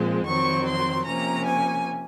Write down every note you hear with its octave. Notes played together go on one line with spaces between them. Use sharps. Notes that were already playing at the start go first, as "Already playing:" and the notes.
Already playing: A#2 F3 G#3 C4
F2 D#3 F#3 C4 C#6
C6
C3 F3 A#3 C#4 A#5
G#5